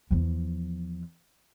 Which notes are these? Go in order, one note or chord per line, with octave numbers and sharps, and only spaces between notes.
E2 F3